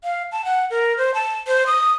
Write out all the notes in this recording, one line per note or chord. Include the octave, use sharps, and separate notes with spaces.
F5
A5
F#5
A#4
C5
A5
C5
D#6